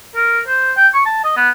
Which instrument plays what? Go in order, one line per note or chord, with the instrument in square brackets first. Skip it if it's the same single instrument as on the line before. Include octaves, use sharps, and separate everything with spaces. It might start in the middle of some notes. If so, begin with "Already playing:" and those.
[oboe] A#4
C5
G5
C#6
A5
D#5
B3